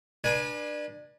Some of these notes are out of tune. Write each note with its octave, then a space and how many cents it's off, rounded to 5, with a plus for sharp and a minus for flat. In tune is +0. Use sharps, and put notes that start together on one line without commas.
D4 +25 B4 -30 G#5 +0